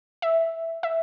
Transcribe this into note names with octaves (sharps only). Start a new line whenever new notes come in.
E5
E5